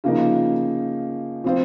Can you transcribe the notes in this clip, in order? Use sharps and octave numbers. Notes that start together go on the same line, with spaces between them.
C#3 F3 A#3 D#4
F3 C4 F4 C5